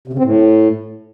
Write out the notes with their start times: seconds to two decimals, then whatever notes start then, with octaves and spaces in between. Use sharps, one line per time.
0.08 C3
0.13 C#3
0.19 C4
0.24 A2